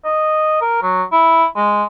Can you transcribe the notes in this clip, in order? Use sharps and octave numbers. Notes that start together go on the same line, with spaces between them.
D#5
A#4
F#3
E4
G#3